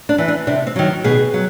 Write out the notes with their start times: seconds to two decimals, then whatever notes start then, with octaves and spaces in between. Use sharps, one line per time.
0.09 D4
0.18 E3
0.28 D4
0.47 C3 D4
0.67 C4
0.76 D#3 F#3
1.04 B2 G#4
1.34 F#3